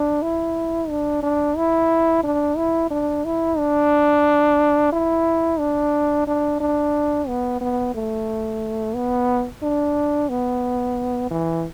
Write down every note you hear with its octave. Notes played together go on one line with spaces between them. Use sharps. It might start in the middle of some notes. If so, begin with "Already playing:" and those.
Already playing: D4
E4
D4
D4
E4
D4
E4
D4
E4
D4
E4
D4
D4
D4
B3
B3
A3
B3
D4
B3
E3